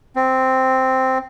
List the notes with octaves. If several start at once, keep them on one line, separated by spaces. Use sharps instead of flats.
C4